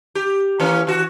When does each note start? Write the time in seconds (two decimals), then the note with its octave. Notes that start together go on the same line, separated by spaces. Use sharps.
0.15 G4
0.60 E3 A#3 C#4
0.87 E3 F#4